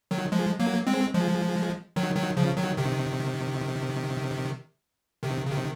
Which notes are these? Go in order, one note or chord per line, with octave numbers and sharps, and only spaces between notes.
D#3 F#3
F3 G#3
F#3 A#3
G#3 C4
F3 G#3
D#3 F#3
D#3 F#3
C#3 F3
D#3 F#3
C3 D#3
C3 D#3
C#3
C3 D#3